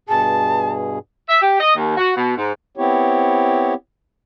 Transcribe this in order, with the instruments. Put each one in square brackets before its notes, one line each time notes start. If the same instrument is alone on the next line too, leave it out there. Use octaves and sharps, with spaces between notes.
[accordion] G2 B2 G#4 [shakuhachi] A5
[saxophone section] E5
G4
D#5
D#2
F#4
B2
G#2
[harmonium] B3 C4 E4 G4 C#5